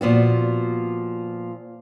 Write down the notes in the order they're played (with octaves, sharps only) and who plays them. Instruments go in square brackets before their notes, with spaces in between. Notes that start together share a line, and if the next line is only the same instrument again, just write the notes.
[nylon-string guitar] A#2 F3 B3 F#4